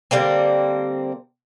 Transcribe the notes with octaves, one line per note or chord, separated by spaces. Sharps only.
D3 G3 A#3 C4